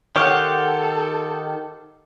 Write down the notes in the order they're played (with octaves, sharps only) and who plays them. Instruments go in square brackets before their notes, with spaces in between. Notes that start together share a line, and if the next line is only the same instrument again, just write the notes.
[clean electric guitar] D#3 G4 [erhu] A4 [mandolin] C5 F5 F#5 [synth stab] C#5